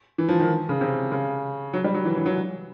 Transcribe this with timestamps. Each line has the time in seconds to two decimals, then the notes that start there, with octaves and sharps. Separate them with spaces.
0.18 E3
0.29 F3
0.40 D#3
0.69 C#3
0.81 C3
1.12 C#3
1.74 F#3
1.84 G3
1.94 F#3
2.05 E3
2.15 E3
2.26 F#3